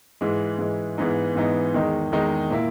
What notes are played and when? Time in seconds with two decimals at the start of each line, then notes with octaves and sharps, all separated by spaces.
0.21 G#2 E3 G#3
0.59 G#2 E3 G#3
0.98 G#2 E3 G#3 B3 D#4
1.36 G#2 E3 G#3 B3 D#4
1.74 E2 D#3 G#3 D#4
2.12 E2 D#3 G#3 D#4
2.50 A#2 A#3 E4